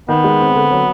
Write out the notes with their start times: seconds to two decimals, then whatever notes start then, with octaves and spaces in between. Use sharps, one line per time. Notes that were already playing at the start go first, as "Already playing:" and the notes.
0.09 D#3 B3
0.24 G#3
0.40 C4
0.56 D3
0.71 F#3